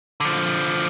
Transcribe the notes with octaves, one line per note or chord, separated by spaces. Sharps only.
D3 F3